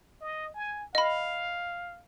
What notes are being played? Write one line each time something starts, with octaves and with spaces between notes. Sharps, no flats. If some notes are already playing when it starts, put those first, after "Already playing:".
D#5
G#5
D#5 F5 B5